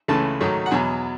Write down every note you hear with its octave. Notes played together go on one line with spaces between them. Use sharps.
C#2 C#3 E3 A3 A5
G#2 D#3 F#3 A3
F#5
E2 B2 F#3 G#5